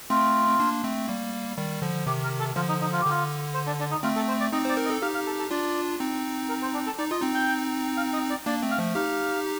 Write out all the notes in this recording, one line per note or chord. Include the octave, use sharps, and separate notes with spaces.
A3 C4 F4
C4
A#3 D4
A3 C4
G3 A#3
D#3 G3
D3 F3
C3 D#3 G4
A#4
A4
D3 F3 F4
D#4
D#4
F4
G4
D3 F4
C5
D4
D4
D#4
A3 C4 F4
A4
C5
D5
C4 D#4 D#5
C5 D5
A#4
D#5
A4
D#4 G4 F5
F5
A4
A4
D4 F4 D5
C4 D#4
A#4
C5
D4
A4
D#4 D5
F4 D#5
C4 D#4
G5
F5
D#5
D5
A#3 D4 D5
A3 C4
F5
F3 A3
D#4 G4 F5